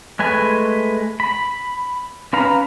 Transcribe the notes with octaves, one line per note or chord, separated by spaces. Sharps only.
G#3 A3 B4 G#5
B5
C#4 B4 F5 A#5